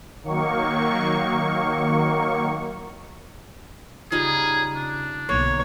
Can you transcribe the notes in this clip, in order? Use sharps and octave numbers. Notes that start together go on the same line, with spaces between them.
D#3 F#3 A#3 C#6
C#3 G3 D#4 F4 G#4
D4
B1 D3 A#3 C#5